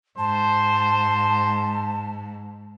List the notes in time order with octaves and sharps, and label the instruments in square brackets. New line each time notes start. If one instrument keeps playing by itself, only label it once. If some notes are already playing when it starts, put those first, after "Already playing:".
[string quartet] G#2 [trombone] C5 [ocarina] A5